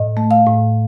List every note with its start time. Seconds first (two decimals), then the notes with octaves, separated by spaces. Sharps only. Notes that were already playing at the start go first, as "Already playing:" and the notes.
Already playing: A2 D#5
0.17 A3
0.31 F5
0.46 A2